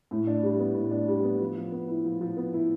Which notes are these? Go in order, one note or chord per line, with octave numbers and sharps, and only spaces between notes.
A2
D4
G3
B3
A2
D4
G3
B3
F3
F3
B3
E4
F3
F3
B3
E4